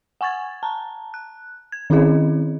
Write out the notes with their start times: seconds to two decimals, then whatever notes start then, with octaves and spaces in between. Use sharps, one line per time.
0.21 F#5 G#5 C#6 G#6 A6
0.63 A5 A#5
1.14 F#6
1.72 G#6
1.90 D#3 C4 C#4 E4 G#4 D#5